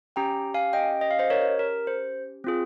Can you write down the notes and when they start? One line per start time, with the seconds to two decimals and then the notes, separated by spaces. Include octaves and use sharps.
0.16 C#4 G4 G5 A#5
0.54 F5 G#5
0.73 D#5 G5
1.01 D#5
1.11 F5
1.19 C5 D#5
1.30 A#4 C#5
1.59 A#4
1.87 C5
2.44 C4 F4 G#4